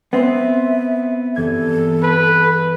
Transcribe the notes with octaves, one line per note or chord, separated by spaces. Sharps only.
B3 C4 E5
G2 E3 A4 G#6
B4 A5 C6